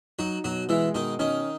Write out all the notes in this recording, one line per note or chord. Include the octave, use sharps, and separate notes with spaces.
F#3 D#4 F#4
B2 F#3 F#4
E3 G#3 E4
B2 D#3 D#4
D#3 C#4 D#4